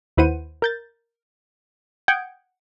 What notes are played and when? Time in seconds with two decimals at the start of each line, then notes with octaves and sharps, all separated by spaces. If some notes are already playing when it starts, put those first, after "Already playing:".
0.17 D#2 E4 B4 C5 F#5 D#7
0.62 A#4 G6 A6
2.08 F#5 G5 D#6 G6 G#6 D7